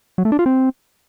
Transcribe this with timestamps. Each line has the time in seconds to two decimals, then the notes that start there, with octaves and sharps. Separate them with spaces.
0.18 F#3
0.25 A3
0.32 D4
0.39 F4
0.46 C4